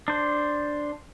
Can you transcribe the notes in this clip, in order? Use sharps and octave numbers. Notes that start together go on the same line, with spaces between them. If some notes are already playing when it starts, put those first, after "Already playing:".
D4 C5